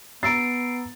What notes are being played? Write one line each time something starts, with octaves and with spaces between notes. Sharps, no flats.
B3 A#5 E6 A6 C7 D7